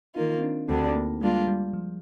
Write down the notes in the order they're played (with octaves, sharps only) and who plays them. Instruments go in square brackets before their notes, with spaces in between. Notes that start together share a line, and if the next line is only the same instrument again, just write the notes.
[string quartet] D#3 A#3 F4 [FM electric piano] D#4
[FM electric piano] C4
D4
[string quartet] D2 D3 G3 D4 [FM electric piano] C4
[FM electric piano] A#3
[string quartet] G3 A#3 D4 F4 [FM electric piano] G#3
[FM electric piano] G3
F3